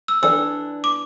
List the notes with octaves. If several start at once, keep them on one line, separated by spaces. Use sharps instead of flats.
E6
E3 D4 A4 D5 E6
D6